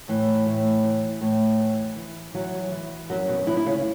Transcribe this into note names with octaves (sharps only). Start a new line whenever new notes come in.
A2 E3
A2
E3
A2
E3
E3
E3 F#3
E3
F#2 F#3
B2 B3
F#2 E3 E4
E4
C#3 C#4